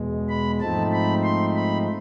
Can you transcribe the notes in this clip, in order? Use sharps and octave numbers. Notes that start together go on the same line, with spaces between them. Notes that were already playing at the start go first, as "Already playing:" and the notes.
Already playing: E2 B2 G#3
B5
G#2 F3 A3 C4 D#4 A5
B5
C6
B5